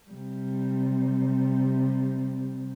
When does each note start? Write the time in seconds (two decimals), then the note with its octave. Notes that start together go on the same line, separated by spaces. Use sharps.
0.10 C3 G3